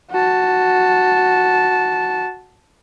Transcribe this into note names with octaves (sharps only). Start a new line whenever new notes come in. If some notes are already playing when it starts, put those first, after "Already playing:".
F#4 A5